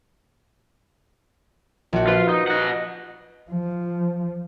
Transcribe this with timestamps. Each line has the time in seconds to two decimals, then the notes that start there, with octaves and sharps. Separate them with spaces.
1.93 A#1 F#4
2.08 F4 B4
2.29 D#4
2.48 D#5 F#5
3.51 F3